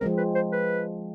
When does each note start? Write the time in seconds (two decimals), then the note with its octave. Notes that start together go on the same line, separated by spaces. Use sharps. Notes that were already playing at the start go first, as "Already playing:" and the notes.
0.01 F3 G#3 C4 A#4
0.18 B4
0.35 C5
0.52 B4